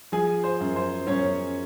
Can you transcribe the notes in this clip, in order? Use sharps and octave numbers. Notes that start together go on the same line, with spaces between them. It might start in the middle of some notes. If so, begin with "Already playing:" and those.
F3 G#4 G#5
C5
F#2
C5
F#2 C#4 C#5